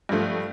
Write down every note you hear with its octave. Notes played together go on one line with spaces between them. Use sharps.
G2 F3 A3